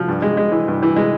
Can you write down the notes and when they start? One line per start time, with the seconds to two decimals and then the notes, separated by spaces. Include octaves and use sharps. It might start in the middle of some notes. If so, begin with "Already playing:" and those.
Already playing: F3
0.08 G2
0.22 G#3
0.37 G#3
0.52 E3
0.68 G2
0.83 E3
0.96 G#3